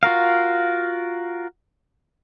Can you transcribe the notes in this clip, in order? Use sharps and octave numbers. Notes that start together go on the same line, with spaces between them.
F4 F#4 A#4 F5